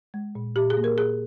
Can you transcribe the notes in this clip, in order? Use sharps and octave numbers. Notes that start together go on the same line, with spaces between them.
G#3
A#2
A#2 G4
G#4
A#3
A#4
A#2 G#4